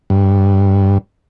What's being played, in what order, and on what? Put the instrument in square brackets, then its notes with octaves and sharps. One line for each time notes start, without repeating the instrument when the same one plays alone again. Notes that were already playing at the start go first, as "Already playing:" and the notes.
[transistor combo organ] G2